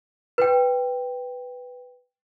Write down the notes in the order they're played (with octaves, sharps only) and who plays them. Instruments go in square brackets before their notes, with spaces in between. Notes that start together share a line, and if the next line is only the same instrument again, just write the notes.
[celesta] B4 G5